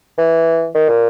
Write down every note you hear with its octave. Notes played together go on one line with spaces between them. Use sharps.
E3
D#3
A#2